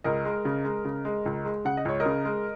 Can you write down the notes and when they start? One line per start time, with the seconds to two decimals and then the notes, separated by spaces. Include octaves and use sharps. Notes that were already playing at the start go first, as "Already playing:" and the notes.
0.04 C#2 A#4 D#5
0.25 G#3
0.45 C#3
0.65 G#3
0.85 C#3
1.05 G#3
1.26 C#2
1.45 G#3
1.65 C#3 F#5
1.77 D#5
1.85 C#2 C#5
2.00 A#4 D#5
2.06 C#3
2.25 G#3